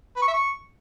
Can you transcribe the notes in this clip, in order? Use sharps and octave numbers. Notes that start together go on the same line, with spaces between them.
B4
C#6
E5
C#6